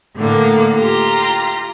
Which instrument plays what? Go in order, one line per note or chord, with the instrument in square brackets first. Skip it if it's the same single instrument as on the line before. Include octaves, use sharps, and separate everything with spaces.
[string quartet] A2 D3 A#3
F4 G4 A#5